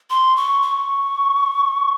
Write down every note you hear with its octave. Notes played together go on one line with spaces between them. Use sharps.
C6
C#6
C#6